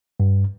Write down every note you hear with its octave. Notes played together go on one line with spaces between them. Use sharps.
G2